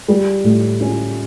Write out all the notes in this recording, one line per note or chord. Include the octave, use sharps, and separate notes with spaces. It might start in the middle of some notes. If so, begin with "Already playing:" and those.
G3
A2
C#4